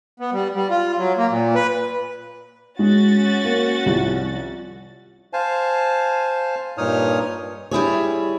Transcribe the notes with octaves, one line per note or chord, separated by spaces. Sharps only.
B3
G3
G3
F4
F#3
A#3
A#2
B4
G#3 C#4 F#4 A6
A#3
C2 F3
C5 F5 G#5 A5
G2 A#2 D#4 C#5 D#6 F6
G3 E4 G#4 C#5